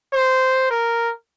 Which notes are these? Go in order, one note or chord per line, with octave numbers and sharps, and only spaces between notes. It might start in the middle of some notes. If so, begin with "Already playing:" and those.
C5
A#4